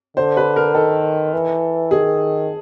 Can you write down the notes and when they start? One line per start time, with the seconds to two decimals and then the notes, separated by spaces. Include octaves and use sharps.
0.17 D3 C5
0.37 B4
0.56 A#4
0.75 D#3 A4
1.33 E3
1.91 D#3 G#4